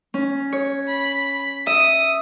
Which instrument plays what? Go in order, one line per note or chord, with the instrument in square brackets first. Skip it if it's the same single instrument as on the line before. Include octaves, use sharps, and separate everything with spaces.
[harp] C#4
C#5
[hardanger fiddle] B5
[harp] E5 [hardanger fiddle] D#6